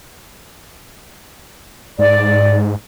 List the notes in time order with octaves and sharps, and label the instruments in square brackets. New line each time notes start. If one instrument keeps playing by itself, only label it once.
[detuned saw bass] G#2 [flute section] D5